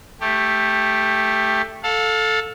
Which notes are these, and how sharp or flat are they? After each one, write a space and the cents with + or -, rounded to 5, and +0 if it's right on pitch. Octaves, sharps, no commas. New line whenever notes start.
A3 +0 G4 +10
A4 +0 F5 +30